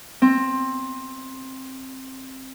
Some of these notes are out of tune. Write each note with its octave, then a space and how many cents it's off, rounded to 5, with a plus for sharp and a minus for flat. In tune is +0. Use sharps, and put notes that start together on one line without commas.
C4 +15